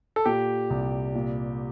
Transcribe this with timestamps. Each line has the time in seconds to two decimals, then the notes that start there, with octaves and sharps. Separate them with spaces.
0.16 A4
0.25 A#2 G4
0.70 C2
1.15 A#2